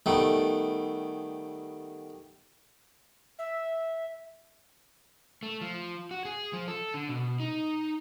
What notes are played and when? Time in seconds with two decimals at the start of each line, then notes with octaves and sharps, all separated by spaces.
0.06 D#3 G3 A3 B3
3.39 E5
5.43 A3
5.61 F3
6.11 F#4
6.25 G#4
6.53 F3
6.68 A4
6.94 D3
7.09 B2
7.40 D#4